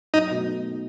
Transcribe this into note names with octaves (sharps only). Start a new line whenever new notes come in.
B1 D#4
B2 A3 D#4 F#4